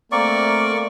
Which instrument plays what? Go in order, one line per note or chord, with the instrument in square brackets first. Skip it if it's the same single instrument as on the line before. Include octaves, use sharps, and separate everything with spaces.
[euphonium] A3 [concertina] A#3 C4 A#4 [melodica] D5 C#6